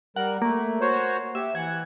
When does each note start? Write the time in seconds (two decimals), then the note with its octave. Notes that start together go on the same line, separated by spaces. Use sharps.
0.16 G3 A#4 F#5 F#6
0.42 A3 A#3
0.81 F#4 C5 C#5
1.35 G4 E5
1.55 E3 F#5 G#6